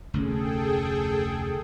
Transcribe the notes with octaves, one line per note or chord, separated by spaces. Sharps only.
F1 D2 C#4 G#4 A4 G5